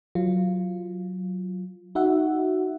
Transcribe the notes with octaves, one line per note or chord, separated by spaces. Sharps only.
F#3 F4
D#4 F#4 E5 F#5